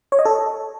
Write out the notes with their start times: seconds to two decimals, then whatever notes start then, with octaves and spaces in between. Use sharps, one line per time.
0.12 C#5
0.19 D#5
0.25 A4